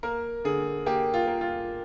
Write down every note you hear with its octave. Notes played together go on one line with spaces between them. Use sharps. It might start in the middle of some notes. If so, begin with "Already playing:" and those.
A#3 A#4
D3 G#4
A#3 G4
F4
A#3
F4